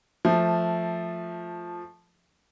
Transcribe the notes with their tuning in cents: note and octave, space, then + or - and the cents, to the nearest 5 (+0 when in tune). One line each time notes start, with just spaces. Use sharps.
F3 +0 A3 +0